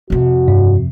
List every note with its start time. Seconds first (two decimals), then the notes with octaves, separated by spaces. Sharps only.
0.10 F2 C3 F#4
0.48 G2